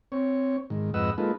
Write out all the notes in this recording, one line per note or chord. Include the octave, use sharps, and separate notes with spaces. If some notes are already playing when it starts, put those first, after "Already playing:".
C4 C#5
G#2 D#3
F2 G#2 B4 D#5 F#5 E6
G#3 A#3 D#4 F4 A4 B4